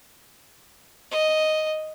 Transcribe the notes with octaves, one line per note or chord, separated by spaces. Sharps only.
D#5